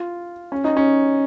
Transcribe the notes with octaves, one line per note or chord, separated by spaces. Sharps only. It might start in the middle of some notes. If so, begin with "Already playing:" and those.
Already playing: F4
C#4
D#4
C#4